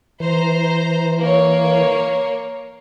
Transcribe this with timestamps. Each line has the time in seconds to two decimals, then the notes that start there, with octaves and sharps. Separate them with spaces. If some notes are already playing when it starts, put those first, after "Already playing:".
0.20 E3 C5 A#5
1.19 A#3 C#5